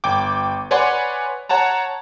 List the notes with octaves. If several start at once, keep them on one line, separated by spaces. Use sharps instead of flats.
G1 G5 D6
B4 C#5 D5 F#5 G#5 C6
C#5 F#5 A5 A#5